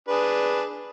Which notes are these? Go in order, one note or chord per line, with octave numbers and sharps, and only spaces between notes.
D4 G#4 B4